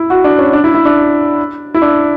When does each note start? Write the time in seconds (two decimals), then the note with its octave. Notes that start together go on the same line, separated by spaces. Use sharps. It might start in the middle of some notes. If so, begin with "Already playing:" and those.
Already playing: E4
0.10 F#4
0.24 D4
0.39 C#4
0.53 D4
0.64 E4
0.74 E4
0.85 D4
1.74 E4
1.82 D4